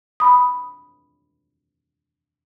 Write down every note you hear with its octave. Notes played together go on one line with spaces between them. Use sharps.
B5 D#6